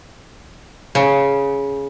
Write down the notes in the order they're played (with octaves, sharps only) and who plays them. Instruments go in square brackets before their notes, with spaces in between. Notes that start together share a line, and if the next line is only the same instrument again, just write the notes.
[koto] C#3